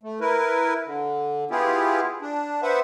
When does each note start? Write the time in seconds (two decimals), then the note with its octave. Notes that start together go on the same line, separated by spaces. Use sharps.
0.03 A3
0.21 E4 A#4 B4
0.86 D3
1.51 B3 E4 F4 G4 G#4
2.22 D4
2.62 B3 B4 C5 E5 F#5